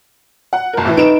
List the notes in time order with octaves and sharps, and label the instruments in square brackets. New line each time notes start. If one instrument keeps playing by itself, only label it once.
[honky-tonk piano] F#5
F#1 A#4
A2 E3
[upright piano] D#4 B4 [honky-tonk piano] D7 E7